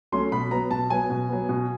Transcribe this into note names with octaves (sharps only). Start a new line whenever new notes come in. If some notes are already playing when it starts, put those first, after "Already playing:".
F#3 A3 C#4 C6
B2 B5
F#3 B3 A#5
B2 A5
F#3 B3 G#5
B2
F#3 B3
B2